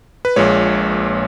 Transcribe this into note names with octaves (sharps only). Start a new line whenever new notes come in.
B4
A#1 A#2 G#3 C#5